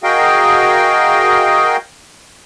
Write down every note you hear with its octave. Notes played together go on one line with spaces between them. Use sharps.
F#4 G#4 A#4 D#5 F5 G5